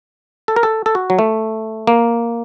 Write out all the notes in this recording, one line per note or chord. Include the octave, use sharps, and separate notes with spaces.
A4
A#4
A4
A4
F#4
F#3
A3
A#3